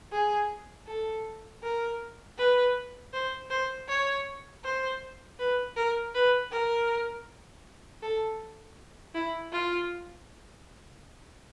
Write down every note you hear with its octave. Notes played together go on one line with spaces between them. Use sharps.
G#4
A4
A#4
B4
C5
C5
C#5
C5
B4
A#4
B4
A#4
A4
E4
F4